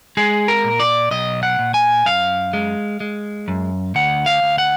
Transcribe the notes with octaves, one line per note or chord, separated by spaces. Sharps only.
G#3 G#4
A#4
A#2
D5
B1 D#5
F#5
A#2
G#5
F#2 F5
G#3
G#3
F#2
D2 F#5
F5
D2
F#5